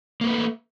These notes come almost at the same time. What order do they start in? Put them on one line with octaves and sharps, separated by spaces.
A#3 A#4 B4 A3